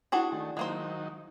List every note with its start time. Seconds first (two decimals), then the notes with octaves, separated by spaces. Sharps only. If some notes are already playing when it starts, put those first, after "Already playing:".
0.12 D4 E4 F#4 G#4 F#5 G5
0.32 D#3 A3
0.57 D#3 F#3 G#3 A#3 D#4 C5